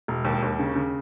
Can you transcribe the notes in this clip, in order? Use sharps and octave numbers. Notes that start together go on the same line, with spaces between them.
E1
D#2
D#2
C#3
C#3